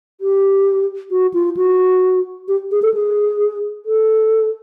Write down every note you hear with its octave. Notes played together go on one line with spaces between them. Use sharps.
G4
F#4
F4
F#4
G4
G#4
A4
G#4
A4